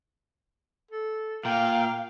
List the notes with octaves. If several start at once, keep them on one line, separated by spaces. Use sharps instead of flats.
A4
A#2 F5 G5